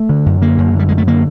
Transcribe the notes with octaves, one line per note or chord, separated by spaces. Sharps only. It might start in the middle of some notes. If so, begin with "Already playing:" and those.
Already playing: A3
D3
F#2
D3 A#3
F#2
D3 G3
F#2 G#3
A3
D3 A#3